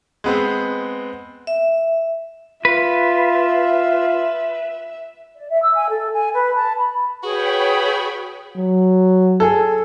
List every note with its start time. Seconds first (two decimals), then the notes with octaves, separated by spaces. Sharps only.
0.24 G#3 B3 C4
1.47 E5
2.65 F4 B4 E5
5.35 D5
5.49 E5
5.62 E6
5.74 G#5
5.89 A4
6.13 G#5
6.34 B4
6.55 A5
6.78 B5
7.23 F#4 G#4 B4 C#5 G5 B5
8.56 F#3
9.40 G#4 A4